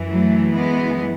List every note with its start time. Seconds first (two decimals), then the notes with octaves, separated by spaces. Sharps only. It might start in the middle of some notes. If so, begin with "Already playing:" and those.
Already playing: F#2 E3
0.10 F#3 A3
0.54 G#3 B3